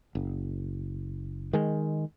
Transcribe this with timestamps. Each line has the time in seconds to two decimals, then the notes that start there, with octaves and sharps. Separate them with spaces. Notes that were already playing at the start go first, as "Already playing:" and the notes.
0.15 F#1
1.53 D#3 G#3